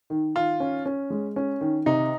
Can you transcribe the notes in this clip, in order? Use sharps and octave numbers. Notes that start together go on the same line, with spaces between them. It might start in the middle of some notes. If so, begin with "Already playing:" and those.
D#3
D#3 F4
C#4
C#4
G#3
C#4
D#3
C3 D#4